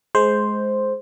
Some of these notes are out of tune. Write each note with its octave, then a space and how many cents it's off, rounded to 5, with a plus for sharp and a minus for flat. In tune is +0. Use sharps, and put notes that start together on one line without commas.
G#3 +20 C5 +0